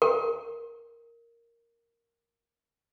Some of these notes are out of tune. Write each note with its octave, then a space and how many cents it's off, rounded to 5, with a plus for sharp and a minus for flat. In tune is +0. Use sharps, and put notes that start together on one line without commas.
A#4 -5